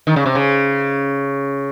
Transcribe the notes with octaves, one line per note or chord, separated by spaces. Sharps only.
D#3
C#3
C3
C#3